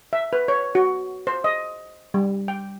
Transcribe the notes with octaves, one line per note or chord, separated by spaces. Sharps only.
E5
B4
C#5
F#4
C5
D#5
G3
G5